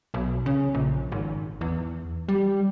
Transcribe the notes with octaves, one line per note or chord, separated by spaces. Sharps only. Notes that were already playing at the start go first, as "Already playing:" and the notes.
B1
C#3
A#1
G#1
E2
G3